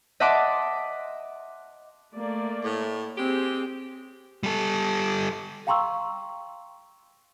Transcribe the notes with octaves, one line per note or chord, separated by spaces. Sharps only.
D#5 E5 F#5 A5 C6 D6
A3 A#3 D5
A2
G#3 C4 G4 G#4
G3 A4
F5 G5 A#5 C6 C#6 E6